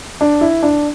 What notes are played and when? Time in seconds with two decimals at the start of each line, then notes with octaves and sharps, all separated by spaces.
0.21 D4
0.41 E4
0.63 D4